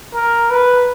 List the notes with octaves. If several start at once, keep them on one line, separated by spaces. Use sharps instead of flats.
A#4
B4